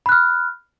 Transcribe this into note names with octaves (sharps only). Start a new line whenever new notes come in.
B5 F6 F#6